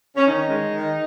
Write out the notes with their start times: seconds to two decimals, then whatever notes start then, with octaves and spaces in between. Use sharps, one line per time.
0.16 C#4
0.27 D#3 D#4
0.49 G#3
0.72 D#3